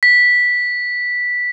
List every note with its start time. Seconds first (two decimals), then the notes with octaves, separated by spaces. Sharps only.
0.03 B6